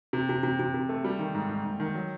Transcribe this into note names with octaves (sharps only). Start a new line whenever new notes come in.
C3
C3
C3
C3
C3
A3
G3
D#3
G#2
G#2
G#2
D#3
F#3